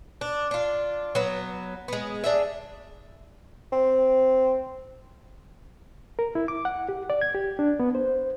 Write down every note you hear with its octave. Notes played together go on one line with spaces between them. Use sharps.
D4
D4 F4
F#3 B3
G#3 B3
D4 G#4 E5
C4
A#4
E4
D6
F#5
G4
D5
G#6
G4
D4
B3
C5